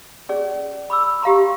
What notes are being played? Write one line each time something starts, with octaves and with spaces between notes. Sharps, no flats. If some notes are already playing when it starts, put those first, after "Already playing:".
C#4 G#4 D5
B5 D6 E6
G4 F5 A#5 C6